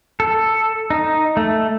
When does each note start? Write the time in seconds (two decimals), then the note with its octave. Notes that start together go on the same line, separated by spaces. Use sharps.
0.20 A4
0.90 D#4
1.37 A3